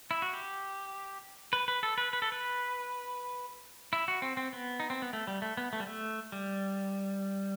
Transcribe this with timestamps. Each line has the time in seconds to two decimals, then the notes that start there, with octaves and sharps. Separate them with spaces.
0.11 E4
0.22 F#4
0.33 G4
1.53 B4
1.68 B4
1.83 A4
1.98 B4
2.13 B4
2.22 A4
2.32 B4
3.93 E4
4.08 F#4
4.22 C4
4.37 C4
4.53 B3
4.80 D#4
4.90 C4
5.02 B3
5.13 A3
5.27 G3
5.42 A3
5.57 B3
5.73 A3
5.80 G3
5.87 A3
6.32 G3